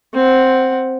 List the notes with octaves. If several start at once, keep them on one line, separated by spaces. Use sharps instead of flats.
C4 F#5